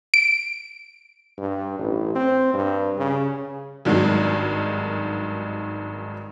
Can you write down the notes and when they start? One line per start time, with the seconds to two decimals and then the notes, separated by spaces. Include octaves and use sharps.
0.14 D7
1.38 G2
1.79 A1
2.15 C4
2.54 G2
2.98 C#3
3.85 G#1 G2 D#3 F#3 G#3